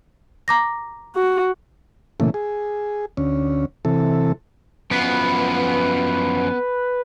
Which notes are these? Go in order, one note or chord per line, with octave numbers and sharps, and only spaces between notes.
A#5 D6 A#6
F#4
A#2 C#3 E3 A3
G#4
D2 C#4
C3 E3 A4
F#2 F3 B3 B4